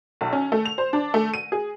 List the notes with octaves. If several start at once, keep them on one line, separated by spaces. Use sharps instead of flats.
B1
C#4
A3
F7
C5
D4
A3
D#7
G#4